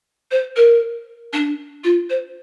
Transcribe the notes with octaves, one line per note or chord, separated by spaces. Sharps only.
C5
A#4
D4
F4
C5